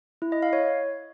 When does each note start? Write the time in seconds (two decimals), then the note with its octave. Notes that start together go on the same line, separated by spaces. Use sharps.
0.22 E4
0.32 D#5
0.43 F5
0.53 C#5